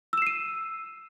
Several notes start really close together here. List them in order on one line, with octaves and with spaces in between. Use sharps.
E6 E7 C7 D#7